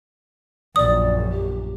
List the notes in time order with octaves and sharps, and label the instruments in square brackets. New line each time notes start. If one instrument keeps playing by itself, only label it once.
[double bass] A#1 F#2 [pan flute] D5 [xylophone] D#6
[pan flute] G4